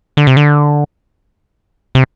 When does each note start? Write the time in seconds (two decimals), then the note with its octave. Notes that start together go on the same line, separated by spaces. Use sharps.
0.17 D3
0.27 C3
0.37 D3
1.95 C3